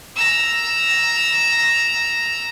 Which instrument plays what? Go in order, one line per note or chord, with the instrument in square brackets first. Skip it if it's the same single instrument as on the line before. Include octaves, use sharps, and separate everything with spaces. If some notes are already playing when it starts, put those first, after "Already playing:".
[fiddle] A#5 E6